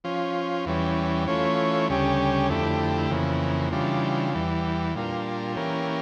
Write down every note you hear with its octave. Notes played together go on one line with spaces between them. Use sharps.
F3 C#4 F4
E2 E3 G3 C#4
E3 A3 C#4 F4 C#5
D2 C#3 G3 C#4 G4
F2 D3 A3 E4 G4
F2 C#3 E3 A#3
C#3 E3 G3 D4 F4
E2 E3 G3
A#2 G3 D4 F4 A#4
E3 A#3 C#4 G4 A#4